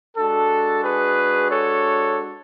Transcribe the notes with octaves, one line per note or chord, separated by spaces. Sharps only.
G#3 D4 F#4 A4
G#4 B4
A4 C#5